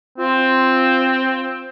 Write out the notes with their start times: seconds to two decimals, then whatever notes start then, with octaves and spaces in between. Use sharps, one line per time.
0.18 C4 F4